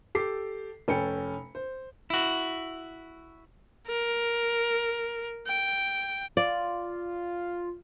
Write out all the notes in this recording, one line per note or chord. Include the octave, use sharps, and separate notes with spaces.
G4 A4 D6 C7
F1 C#4 A4 G5 C#7
C5
E4 F#4
A#4
G5
F4 D5